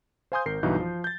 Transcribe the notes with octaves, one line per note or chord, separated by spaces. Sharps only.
C5 F5 G#5 C6 D#6 G6
G#1 A#4 C7
B1 G2 E3 D#4 F#4 G6
F3
G6 A6